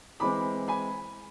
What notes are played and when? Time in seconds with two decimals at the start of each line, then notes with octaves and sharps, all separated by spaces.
0.20 E3 G#3 C4 B5 D6
0.68 G#5 B5